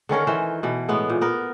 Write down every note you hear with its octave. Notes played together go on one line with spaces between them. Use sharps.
D3 D#3 C#4 A#4
D#3 E3 C5
B2 E3
A2 G#3 B3
A#2
B3 A#4